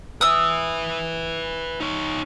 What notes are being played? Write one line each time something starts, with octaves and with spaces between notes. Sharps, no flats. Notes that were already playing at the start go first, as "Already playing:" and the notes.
B4 E5 D#6 E6
D#4 C#5